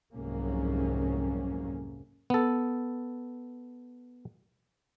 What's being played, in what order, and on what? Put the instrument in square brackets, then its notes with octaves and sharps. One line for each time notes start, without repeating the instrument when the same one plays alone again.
[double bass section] C2 F2 G#2 F#3 A#3 C#4
[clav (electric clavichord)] B3 A4